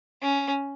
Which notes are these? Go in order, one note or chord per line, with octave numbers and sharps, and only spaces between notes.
C#4